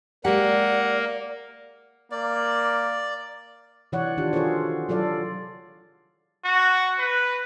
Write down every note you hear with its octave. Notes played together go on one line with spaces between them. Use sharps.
G#3 A#3 G4 D5 F#5
A#3 D5
C3 E3 C#5 D5 F#5
D#3 D4 F4 G4
F4 F#4 G#4 A4 C5 C#5
F#3 F4 A4 D5 F5
F#4
B4